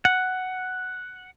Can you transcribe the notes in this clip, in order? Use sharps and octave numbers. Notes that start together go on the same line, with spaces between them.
F#5